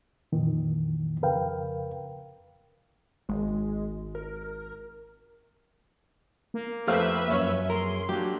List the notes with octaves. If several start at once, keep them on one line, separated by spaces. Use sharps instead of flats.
F2 A#2 D#3 E3
F2 C#3 A#4 B4 F5 G5
G#1 G#3
A#4
A#3
F2 A3 C4 B4 E5 F5
F#2 C#4 C#5
G#4 A#4 C6
F#3 A3 A#3 D4 G4